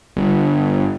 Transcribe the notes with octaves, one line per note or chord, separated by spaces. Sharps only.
G1